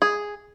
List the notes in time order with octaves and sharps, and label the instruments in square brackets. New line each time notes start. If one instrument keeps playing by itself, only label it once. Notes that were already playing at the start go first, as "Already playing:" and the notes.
[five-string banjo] G#4